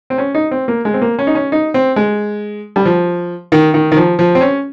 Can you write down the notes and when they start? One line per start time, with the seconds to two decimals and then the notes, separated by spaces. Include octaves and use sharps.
0.10 C4
0.18 C#4
0.35 D#4
0.51 C4
0.68 A#3
0.85 G#3
0.94 C4
1.02 A#3
1.19 C#4
1.27 D#4
1.35 C#4
1.52 D#4
1.74 C4
1.96 G#3
2.76 G3
2.85 F3
3.52 D#3
3.74 D#3
3.92 D#3
3.97 F3
4.19 F3
4.35 C4
4.41 C#4